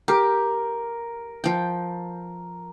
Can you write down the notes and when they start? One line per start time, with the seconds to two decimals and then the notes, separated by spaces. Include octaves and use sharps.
0.08 G4 A#4
1.44 F3 G5